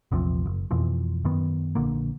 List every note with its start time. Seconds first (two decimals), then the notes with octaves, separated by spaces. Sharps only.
0.12 A#1 E2 C3 F3
0.46 F#1
0.71 F2 B2 E3 F3
1.25 F#2 D#3 B3
1.75 A#1 D3 A#3